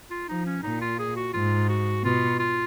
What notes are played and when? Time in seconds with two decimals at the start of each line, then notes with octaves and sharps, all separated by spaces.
0.11 F4
0.28 F3 D#4
0.46 C#4
0.63 A#2 D#4
0.81 F4
0.99 G#4
1.16 F#4
1.33 G#2 F4
1.69 F#4
2.04 B2 F4
2.39 F4